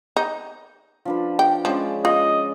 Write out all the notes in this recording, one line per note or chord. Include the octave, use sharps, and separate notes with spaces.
D#4
F3 D4 B4
G5
F3 G#3 C#4 D5
F4 D#5